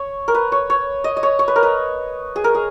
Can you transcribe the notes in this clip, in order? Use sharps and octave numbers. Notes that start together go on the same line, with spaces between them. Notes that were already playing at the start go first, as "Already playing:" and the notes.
Already playing: C#5
A#4
B4
C#5
C#5
D#5
D#5
C#5
C#5
B4
A#4
B4
G#4
A#4
G#4